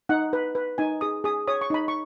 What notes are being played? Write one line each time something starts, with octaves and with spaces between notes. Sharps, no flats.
D#4 F#5
B4
B4
D#4 G#5
G#4 D#6
G#4 D#6
C#5 D#6
C#6
D#4 B5
C#6